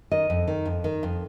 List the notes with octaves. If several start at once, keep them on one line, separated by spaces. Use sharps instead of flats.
D#3 D#5
F2
D#3
F2
D#3
F2